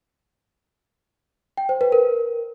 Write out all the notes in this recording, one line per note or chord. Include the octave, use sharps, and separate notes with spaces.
G5
C5
B4
A#4